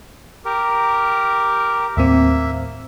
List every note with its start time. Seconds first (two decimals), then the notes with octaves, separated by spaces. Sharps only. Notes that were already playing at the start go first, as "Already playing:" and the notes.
0.45 G4 A#4
1.97 D#2 A2 A#3 C4 E5